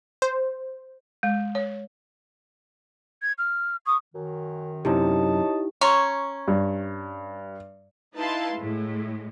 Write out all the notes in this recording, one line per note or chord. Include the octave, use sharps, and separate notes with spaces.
C5
G#3
C#5
G#6
F6
C#6 D#6
F#2 D#3
F#2 C3 D#4 E4 G4 C#5 D#5 A5
C#4 A#5 C6 C#6
G2
D#4 E4 B4 F5 A5 C6
A2 G#3